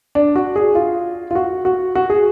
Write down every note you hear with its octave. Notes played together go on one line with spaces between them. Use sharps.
D4
F#4
G#4
F4
F4
F#4
F#4
F#4
G#4